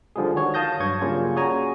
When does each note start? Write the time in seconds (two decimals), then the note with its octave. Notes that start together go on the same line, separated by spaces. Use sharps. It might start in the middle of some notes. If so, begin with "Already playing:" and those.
0.16 D3 F3 G3 G#3 G#4
0.36 D#3 F#4 C#5
0.54 F5 A5 D#6 G6 A#6
0.80 G2 F#3 C#6 G#6
1.01 C#3 F#3 G3 A#3 C#4 F4
1.36 F#4 G#4 C#5 G#5 A#5